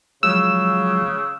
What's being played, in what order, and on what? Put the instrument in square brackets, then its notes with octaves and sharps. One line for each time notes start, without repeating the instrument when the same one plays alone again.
[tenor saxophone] C#3 [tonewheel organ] F3 F#3 G#3 [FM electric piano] E6